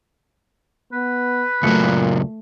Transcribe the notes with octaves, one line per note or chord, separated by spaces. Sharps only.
B3 B4
C#2 A#2 F#3 A3 C#7